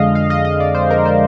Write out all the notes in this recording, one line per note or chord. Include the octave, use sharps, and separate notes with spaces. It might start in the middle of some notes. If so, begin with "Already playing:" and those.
Already playing: F2 D3 G#3 D#5 F5
F5
D#5
D#5
D5
C5
A#4
C5